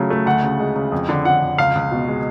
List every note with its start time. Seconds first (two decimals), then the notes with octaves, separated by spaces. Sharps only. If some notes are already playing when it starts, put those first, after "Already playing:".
Already playing: C#3 F#3 A3
0.10 A3
0.26 D2 F#5
0.43 C#3
0.60 G#3
0.76 C#3
0.92 F2
1.09 D3
1.25 D3 F#5
1.42 F2
1.58 C#2 F5
1.75 C#2
1.91 B2
2.08 G#3